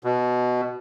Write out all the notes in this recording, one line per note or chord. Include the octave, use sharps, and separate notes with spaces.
B2